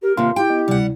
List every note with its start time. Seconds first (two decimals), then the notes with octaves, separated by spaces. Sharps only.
0.02 G4 A#4
0.17 D#2 C3 A#3 F4 F5 C6
0.36 E4 G4 G5
0.50 B3 D#5
0.68 D2 C3 G3 F#5